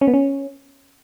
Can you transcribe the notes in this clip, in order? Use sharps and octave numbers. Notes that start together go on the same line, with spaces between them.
C#4
B3
C#4